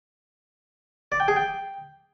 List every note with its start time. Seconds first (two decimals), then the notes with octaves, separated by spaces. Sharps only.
1.12 D5
1.20 G5
1.28 G#4
1.36 G5